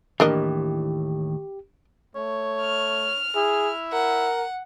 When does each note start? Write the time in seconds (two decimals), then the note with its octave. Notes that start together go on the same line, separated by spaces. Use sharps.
0.20 D#2 A2 E3 D4 G4 A#4 D#5
2.15 A3 C#5
2.62 F6
3.35 E4 G#4
3.93 A#4 F#5